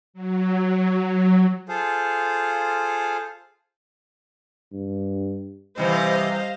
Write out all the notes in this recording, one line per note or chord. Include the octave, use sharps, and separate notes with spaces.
F#3
F4 G#4 A4 C5 F5
G2
C3 E3 G3 C5 D#5 F5